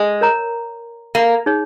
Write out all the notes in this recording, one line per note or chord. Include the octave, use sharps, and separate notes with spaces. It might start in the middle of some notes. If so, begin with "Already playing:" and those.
Already playing: G#3
A#4 C#5 A#5
A#3
D#4 G#4 C#5